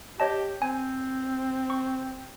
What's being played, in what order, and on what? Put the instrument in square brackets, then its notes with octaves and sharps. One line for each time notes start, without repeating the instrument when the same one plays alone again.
[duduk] G4 [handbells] C#5 D#5 A5
[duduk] C4 [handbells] G#5
[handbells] C#6